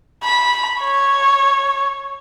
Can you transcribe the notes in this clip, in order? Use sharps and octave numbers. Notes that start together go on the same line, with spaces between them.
B5
C#5